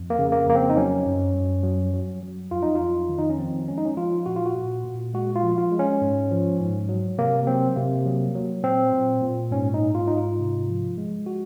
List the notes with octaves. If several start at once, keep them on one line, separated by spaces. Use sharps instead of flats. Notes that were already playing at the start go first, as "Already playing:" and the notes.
Already playing: F2
A#3
C#3
A#3
F2 A#3
C4
D#4
F#3 C#4
F#2
F#2
F#3
F#3
F#3
F2 F4
D#4
F2 F4
D#3
D#4
C#4
F3 C4
G#3 C#4
D#4
C#4
F3 F4
A#2 F#4
F4
F#4
A#2
A#2
G#3 F#4
F4
F3
F4
G#3
C#4
G#2
F3
G#2
F#3
C3 A#3
F#3 C4
C3 A#3
F#3
F#3
A#2 C4
A#2
A#2
G#2 C#4
D#4
G#2
F4
G#2 D#4
F4
C3
F3
G#3
F#4